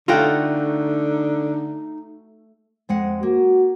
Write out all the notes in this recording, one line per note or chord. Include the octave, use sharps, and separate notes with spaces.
D3 A3 D#4 F4 F#4 G5 A#5
F2 G#3 F#5
A#3 F#4